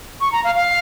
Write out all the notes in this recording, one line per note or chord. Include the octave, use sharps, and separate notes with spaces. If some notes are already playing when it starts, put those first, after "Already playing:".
C#6
A#5
F5
F5